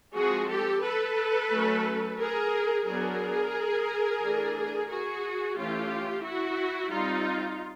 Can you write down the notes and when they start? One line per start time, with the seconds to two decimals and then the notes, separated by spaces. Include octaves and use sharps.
0.15 F3 G#3 C4 F#4 G#4
0.50 G4 A4
0.84 A4 B4
1.50 F#3 A3 C#4
2.18 G#4 A#4
2.86 F#3 B3 D4 G#4 A#4
4.22 E3 A3 D4
4.89 F#4 G#4
5.56 E3 A3 C#4 F4 G4
6.23 E4 F#4
6.91 G3 C4 D#4 F4